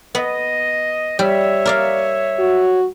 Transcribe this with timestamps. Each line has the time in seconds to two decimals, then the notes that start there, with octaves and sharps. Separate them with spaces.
0.15 B3 D#5
1.19 G3 C#5 E5
1.65 A#4 D5 F5
2.39 F#4